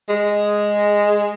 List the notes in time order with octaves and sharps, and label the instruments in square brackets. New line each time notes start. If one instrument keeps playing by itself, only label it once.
[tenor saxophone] G#3